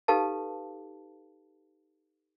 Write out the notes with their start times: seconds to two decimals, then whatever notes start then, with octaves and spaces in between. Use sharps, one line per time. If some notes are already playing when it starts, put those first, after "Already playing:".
0.08 D#4 G4 A4 B4 F5 A5